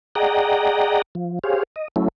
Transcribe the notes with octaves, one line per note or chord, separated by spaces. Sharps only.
G#4 D5 D#5 F#5 G5 A#5
F3
G4 G#4 C5 C#5 F5
D#5
F#3 A3 C#4 E4